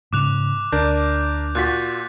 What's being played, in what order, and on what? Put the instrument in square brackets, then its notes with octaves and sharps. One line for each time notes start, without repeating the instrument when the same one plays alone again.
[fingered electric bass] G#2 C#3 [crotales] D6 F#6 F7
[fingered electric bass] D2 [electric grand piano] D4 A#4 [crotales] G6
[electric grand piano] A#2 F4 F#4 [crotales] F#6 A6 B6